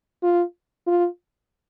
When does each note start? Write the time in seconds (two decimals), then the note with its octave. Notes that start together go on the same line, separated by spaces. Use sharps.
0.23 F4
0.87 F4